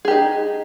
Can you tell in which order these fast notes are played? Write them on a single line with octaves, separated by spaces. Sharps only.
G#4 G4 D#4